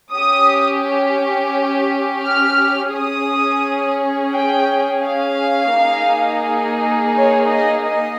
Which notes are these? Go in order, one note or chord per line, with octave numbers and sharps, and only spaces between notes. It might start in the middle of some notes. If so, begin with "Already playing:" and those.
C#4 G4 D#6
F6
C#4 G#4 D#6
G5
F5
A#3 D#4 G#4
C#5
D#5
D#5